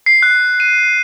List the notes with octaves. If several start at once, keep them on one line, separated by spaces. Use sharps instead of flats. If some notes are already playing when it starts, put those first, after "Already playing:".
C7
F#6
D#7